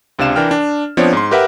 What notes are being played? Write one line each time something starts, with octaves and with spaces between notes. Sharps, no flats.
C#2 C3 D4 F5 E7
E3 D4 A#4 G5 F6
D4
F3 B3 C4 D4 C#5 D5
G#2 C6
G4 A#4 B4 E5 F#5